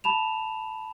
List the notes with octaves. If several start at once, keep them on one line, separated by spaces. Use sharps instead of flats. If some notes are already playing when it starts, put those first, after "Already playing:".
A5 B5 E7 F7